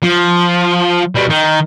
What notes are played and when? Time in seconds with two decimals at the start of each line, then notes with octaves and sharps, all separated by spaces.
0.03 F3
1.15 B2 G3
1.30 D#3